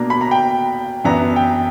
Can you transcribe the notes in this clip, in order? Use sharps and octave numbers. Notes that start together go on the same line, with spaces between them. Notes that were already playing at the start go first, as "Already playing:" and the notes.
Already playing: B2 A#3 D4 A#5
B5
A#5
G5
F#2 E3 B3 D4 A#5
G5